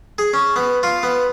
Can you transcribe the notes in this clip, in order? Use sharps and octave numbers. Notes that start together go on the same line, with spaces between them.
G#4
C#4
B3
F4
B3